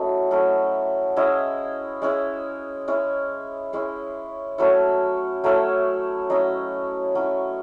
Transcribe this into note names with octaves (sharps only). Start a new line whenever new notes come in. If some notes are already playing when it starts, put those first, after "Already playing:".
Already playing: F#3 A3 C#4 E4 D#5
F#3 A3 C#4 E4
G#3 C#4 E4 D#5
G#3 C#4 E4
G#3 C#4 E4
G#3 C#4 E4
F#3 A3 C#4 E4 C#5
F#3 A3 C#4 E4
F#3 C#4 E4 D#5
F#3 C#4 E4